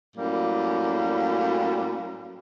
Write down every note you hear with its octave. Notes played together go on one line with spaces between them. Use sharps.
F#2 A2 G3 A#3